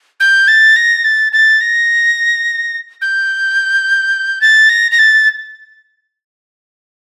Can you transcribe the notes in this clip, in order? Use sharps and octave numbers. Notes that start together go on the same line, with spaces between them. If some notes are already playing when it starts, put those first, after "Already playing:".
G6
A6
A#6
A6
A6
A#6
G6
A6
A#6
A#6
A6